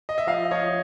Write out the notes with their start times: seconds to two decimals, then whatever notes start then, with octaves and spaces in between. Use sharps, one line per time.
0.09 D#5
0.18 E5
0.27 F3 D#5 F5
0.51 F3 C#5 D#5